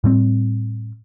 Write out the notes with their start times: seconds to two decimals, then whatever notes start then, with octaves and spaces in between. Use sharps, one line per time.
0.04 A2 G3 C4